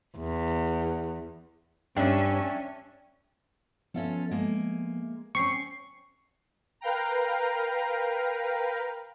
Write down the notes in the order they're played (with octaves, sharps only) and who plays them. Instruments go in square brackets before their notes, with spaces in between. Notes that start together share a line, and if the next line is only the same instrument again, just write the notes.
[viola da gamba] E2
[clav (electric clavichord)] G2 [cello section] C#4 [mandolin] D4 E5 [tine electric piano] G5
[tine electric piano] F3 B3 E5 [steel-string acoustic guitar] C#4 F4 A4
[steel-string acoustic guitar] G#3 A#3
[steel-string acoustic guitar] C4 C#4 [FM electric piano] C#6 C7
[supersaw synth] A#4 B4 F5 G5 A#5